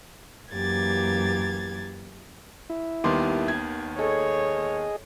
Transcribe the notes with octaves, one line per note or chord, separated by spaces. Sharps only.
F#2 E3 A#3 G4 G#6 A6
E4
D#2 D#3 G3 B3 C6 D6
G#6
G#4 A4 C#5 D#5